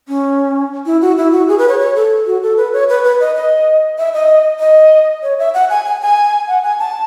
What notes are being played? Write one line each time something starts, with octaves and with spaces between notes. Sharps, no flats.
C#4
E4
F#4
E4
F#4
G#4
B4
C#5
C#5
A4
F#4
A4
B4
C#5
B4
B4
D#5
D#5
E5
D#5
D#5
C#5
E5
F#5
G#5
G#5
G#5
F#5
G#5
A5